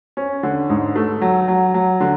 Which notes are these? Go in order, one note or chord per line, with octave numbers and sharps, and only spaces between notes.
C#4
D3
G#2
A3
F#3
F#3
F#3
D3